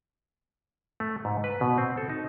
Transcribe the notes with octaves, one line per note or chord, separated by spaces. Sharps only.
A3
G#2
B4
B2
C4
A4
D#4